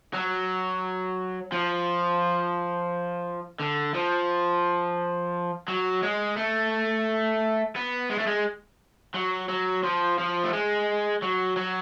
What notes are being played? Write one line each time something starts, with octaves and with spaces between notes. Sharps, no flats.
F#3
F3
D3
F3
F#3
G#3
A3
B3
G#3
A3
G#3
F#3
F#3
F3
F3
A3
G#3
F#3
F#3